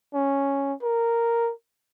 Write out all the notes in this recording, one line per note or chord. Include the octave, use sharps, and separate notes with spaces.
C#4
A#4